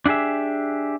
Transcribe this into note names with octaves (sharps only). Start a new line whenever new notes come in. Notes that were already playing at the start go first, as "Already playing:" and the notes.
D4 E4 G4 G#4 E5